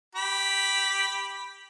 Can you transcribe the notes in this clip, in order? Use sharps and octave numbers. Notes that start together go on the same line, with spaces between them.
G4 B5